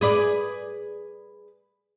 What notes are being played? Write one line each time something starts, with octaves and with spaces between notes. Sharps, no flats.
G#4 B4 D5